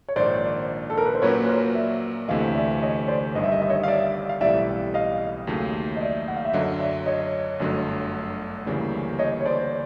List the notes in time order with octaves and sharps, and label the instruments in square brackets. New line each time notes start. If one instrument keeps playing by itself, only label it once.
[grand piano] C#5
[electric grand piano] A#1 G#2 D#3 [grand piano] C5 D5
[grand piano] A4
A#4
B4
C5
[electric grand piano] A#2 F#3 A#3 C#4 F#4 [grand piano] B4 C#5
[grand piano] B4
A#4 C5
D5 E5
[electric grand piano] D2 C3 E3 A3 [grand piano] D#5 F5
[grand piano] D5 E5
C#5 D#5
C5 D5
[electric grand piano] G1 G2 D#3 G3 [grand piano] D#5
[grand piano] E5
D#5
E5
C#5 D#5
F5
D5 E5
F5
[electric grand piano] B1 A2 E3 G3 C4 [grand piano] D5 E5
[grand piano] D#5 F5
[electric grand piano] D#2 C#3 F#3 A3
[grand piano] D#5
D5 E5
F#5
F5
E5
[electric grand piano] F#2 D3 F#3 [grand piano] C#5 D#5
[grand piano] D5 E5
C#5 D#5
[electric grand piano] G1 F#2 D3 F#3 A3
D2 C#3 E3 G3 A#3
[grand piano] C#5 D#5
C#5
C5 D5